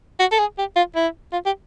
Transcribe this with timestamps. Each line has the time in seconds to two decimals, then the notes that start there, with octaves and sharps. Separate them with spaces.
0.20 F#4
0.32 A4
0.39 G#4
0.59 G4
0.76 F4
0.96 E4
1.33 F4
1.46 G4